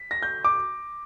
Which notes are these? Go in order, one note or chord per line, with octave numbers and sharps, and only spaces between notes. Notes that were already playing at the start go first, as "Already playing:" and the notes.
Already playing: B6
A#6
G6
D6